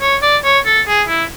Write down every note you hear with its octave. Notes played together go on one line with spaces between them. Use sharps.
C#5
D5
C#5
A4
G#4
E4